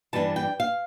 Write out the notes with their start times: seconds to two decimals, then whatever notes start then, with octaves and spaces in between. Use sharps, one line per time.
0.13 G2 E3 G3 D4 A5
0.36 G5
0.60 F5